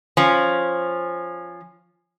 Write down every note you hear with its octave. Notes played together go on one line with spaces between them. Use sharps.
F3 C#4